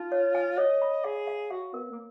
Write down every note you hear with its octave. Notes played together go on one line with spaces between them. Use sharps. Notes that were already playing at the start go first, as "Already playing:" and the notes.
Already playing: D#4 F4
C#5
G#5
C#5 D#5
B5
G#4 F5
F5
F#4 F5
B3 A#4
A#3